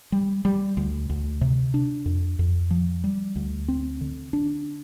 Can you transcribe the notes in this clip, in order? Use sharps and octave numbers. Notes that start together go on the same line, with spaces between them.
G3
G3
D2
D2
C3
D4
F2
F2
F3
G3
D2
C4
D3
D4